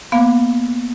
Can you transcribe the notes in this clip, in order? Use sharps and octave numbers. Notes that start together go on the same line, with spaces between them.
A#3 B3 F5